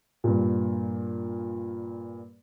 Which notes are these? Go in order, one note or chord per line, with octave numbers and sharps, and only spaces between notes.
G2 A#2